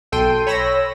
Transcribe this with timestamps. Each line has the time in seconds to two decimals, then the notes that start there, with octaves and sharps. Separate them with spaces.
0.12 B1 A4 G5 C6 D#7
0.47 C#5 B5 E6 A#6